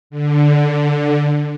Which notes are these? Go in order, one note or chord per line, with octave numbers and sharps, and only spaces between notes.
D3